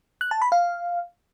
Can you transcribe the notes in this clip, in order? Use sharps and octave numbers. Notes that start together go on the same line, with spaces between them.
F#6
A5
B5
F5